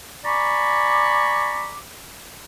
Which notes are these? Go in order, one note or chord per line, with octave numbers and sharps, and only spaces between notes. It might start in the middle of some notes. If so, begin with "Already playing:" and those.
D5 G#5 A#5 B5 C#6 D6